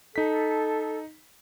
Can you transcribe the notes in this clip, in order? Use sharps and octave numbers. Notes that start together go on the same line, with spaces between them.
D#4 A4 B6